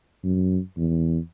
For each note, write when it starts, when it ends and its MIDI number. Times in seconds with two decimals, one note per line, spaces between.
0.24 0.59 42
0.77 1.18 40